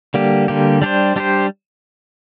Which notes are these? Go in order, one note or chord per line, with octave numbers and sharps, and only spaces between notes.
D3 G3 A#3 G4
D3 G3 A#3 G4
G3 D4 G4 C5
G3 D4 G4 C5